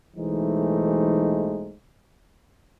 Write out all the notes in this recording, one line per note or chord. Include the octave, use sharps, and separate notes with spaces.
B1 E3 G#3 A3 D#4 C5